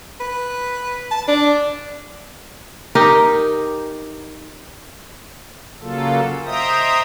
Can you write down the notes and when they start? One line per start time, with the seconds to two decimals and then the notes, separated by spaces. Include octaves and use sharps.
0.20 B4
1.11 A5
1.28 D4
2.95 D#4 G4 A#4
5.81 C#3 F#3 A#3 F4 A4
6.46 C5 D#5 E5 G5 A#5 D#6